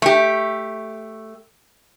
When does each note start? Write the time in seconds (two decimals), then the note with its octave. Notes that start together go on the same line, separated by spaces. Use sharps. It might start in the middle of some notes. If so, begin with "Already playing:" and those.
0.02 A3 G4